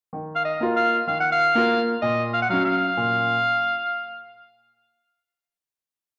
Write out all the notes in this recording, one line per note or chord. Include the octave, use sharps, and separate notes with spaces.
D#3
F5
D#5
A#3 F4 A#4
F5
D#3 F5
F#5
F5
A#3 F4 A#4
A#2 D#5
F5
F#5
F#3 C#4 F5
F5
A#2